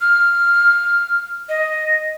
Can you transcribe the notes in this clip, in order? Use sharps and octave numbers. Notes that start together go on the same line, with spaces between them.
F6
D#5